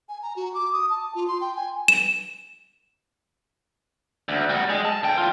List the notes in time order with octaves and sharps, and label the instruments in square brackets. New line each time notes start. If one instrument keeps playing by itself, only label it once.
[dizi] G#5
A#5
F#4
D6
D#6
A5
F4
C6
G5
G#5
[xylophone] E7
[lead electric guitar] D2
G3 F#4
G#3
A5
D2 G5
E3 F4